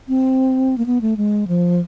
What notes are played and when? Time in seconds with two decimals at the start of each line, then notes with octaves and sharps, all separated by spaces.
0.08 C4
0.78 A#3
0.86 B3
1.01 A3
1.17 G#3
1.48 F3